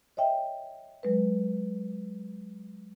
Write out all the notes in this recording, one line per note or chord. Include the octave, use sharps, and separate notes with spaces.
C#5 D#5 E5 G5
F#3 G#3 B4